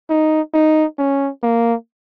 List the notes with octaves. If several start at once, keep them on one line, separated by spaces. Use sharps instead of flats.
D#4
D#4
C#4
A#3